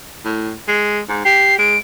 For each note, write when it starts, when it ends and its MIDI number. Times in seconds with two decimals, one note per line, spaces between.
0.25 0.53 45
0.68 1.00 56
1.09 1.25 44
1.25 1.58 67
1.25 1.58 96
1.58 1.76 56
1.58 1.78 98